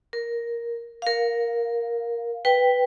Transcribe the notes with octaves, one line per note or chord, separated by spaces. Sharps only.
A#4
A#4 F5
B4 G5